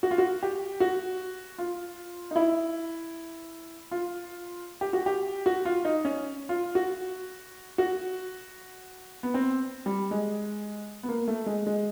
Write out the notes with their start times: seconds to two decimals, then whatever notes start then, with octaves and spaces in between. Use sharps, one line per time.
0.03 F#4
0.11 F4
0.18 F#4
0.43 G4
0.80 F#4
1.58 F4
2.31 D#4
2.36 E4
3.91 F4
4.81 G4
4.93 F#4
5.06 G4
5.46 F#4
5.65 F4
5.85 D#4
6.05 C#4
6.49 F4
6.75 F#4
7.78 F#4
9.23 B3
9.34 C4
9.86 G3
10.11 G#3
11.03 B3
11.09 A#3
11.28 A3
11.46 G#3
11.67 G#3